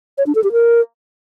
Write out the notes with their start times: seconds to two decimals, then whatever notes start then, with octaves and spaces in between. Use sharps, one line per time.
0.18 C#5
0.26 D4
0.35 A4
0.44 G4
0.52 A#4